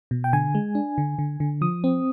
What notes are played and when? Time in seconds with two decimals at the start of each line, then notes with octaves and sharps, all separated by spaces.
0.11 B2
0.24 G5
0.33 D3 G#5
0.55 G#3
0.75 D4
0.98 D3
1.19 D3
1.40 D3
1.61 F3 D#6
1.84 C4